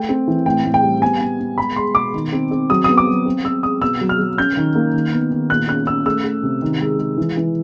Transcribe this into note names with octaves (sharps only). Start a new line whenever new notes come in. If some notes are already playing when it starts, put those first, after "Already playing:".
Already playing: A3 G5
C4
E3
A2 G5
A2
G5
G3
B3 G#5
B3
B3
G#3 B5
G#3 C6
B2 D6
D#3
C4
C4
F#3 D#6
B3 D#6
D6
F#3
C4
C4 E6
G#3 D#6
B2 E6
F#3
F6
F#3
C#4 G6
D#3
A#3
D#3
B3
D#3
A#2 F#6
C#4 F#6
C#4 E6
A3 E6
A3
C3
D#3
G#3
G#3
E3
E3